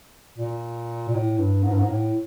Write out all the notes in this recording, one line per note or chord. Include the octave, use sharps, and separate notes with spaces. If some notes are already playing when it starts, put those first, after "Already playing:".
A#2
A#2
A2
G2
G#2
G2
G#2
A2